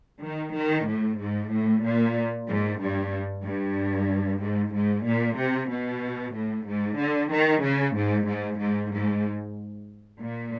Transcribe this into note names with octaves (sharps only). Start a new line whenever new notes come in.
D#3
D#3
A2
G#2
A2
A#2
G#2
G2
G2
G#2
G#2
A#2
C3
B2
A2
G#2
D3
D#3
C#3
G#2
G#2
G#2
G#2
A#2